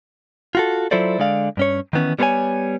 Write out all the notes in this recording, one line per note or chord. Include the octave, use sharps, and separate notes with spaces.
F4 F#4 A4
F#3 E4 F4 A4 C5 D5
D3 G#3 D5 F5
G2 C#4 C#5
D#3 E3 B3 C#4
G3 B3 G#4 C5 C#5 G#5